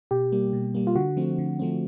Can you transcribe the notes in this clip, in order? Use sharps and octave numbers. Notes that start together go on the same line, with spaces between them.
B2 G4
G3 A#3
B2
G3 A#3
F4
D3 F#4
F3 A3 C4
D3
F3 A3 C4